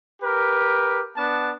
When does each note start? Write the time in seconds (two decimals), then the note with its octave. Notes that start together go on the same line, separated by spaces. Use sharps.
0.22 G4 A#4 B4
1.16 B3 D4 A5